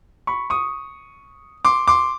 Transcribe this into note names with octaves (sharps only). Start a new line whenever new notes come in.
B5 C#6
C#6 D#6
C6 D6
C6 D6